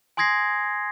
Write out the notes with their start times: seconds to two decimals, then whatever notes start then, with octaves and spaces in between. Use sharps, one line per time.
0.17 G#5 C6 D#6 G#6 A#6 C7